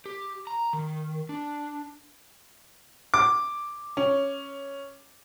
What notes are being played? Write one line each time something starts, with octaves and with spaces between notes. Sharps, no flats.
G4
A#5
D#3
D4
D6
C#4